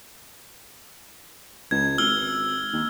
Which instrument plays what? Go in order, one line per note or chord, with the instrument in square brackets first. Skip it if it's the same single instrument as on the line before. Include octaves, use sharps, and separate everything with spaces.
[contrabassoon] C#2 [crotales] G#6
[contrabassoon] G#1 [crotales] E6 F6 G7
[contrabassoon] D#2